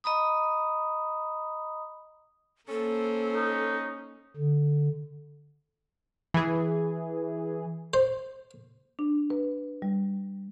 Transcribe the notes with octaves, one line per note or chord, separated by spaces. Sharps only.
D#5 A#5 B5 D#6
A#3 C#4 A4 C5
D#4
D3
E3 G#4
C5
D4
B4
G3